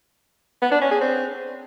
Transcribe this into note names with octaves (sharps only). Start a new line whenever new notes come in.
B3
D4
C#4
G#4
C4